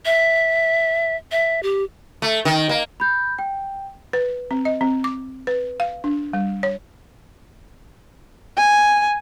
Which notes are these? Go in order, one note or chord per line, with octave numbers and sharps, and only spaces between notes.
E5
E5
G4
A3
D#3
A#3
B5 G6
G5
B4
C4
D#5
C4
D6
B4
F5
D4
G3
C#5
G#5